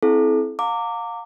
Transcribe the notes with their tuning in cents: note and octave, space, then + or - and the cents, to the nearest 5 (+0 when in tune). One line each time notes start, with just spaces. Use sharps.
C4 +0 E4 +0 A4 -40
F5 +30 A#5 -30 D6 -5